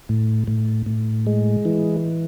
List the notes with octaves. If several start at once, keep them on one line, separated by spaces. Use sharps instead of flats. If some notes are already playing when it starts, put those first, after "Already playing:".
A2
A2
A2
G#3
E3